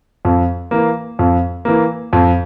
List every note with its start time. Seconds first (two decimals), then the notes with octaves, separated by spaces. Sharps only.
0.25 F2
0.71 E3 A#3
1.19 F2
1.65 E3 A#3
2.13 F2